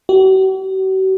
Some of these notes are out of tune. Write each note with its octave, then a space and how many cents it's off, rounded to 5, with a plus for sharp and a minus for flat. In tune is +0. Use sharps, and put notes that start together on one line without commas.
F#4 +45